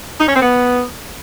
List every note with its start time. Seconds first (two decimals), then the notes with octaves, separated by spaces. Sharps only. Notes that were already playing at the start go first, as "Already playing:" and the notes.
0.20 D#4
0.28 C#4
0.35 C4
0.42 B3